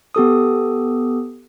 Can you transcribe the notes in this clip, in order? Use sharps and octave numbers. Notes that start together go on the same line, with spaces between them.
B3 G4 A4 D#6